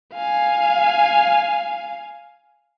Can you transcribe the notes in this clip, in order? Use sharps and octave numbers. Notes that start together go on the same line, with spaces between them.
F5 G#5